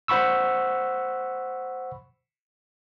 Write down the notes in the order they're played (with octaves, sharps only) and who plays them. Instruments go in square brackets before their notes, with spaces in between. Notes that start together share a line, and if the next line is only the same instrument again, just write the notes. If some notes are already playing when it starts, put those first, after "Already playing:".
[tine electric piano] C5 F#5 B5 C#6 E6